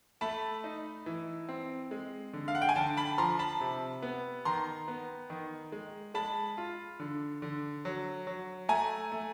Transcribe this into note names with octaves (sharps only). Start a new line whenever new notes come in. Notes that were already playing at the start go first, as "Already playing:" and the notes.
A3 A5 B5
D#4
E3
C4
G#3
D3
F5
F#5
G5
G#5
D3 G5 A5
A5 B5
F3 A#5 C6
A5 B5
C3
B3
D#3 A#5 C6
B3
D#3
G#3
G#3 A5 B5
F4
D3
D3
F#3
F#3
A3 G#5 A#5
A3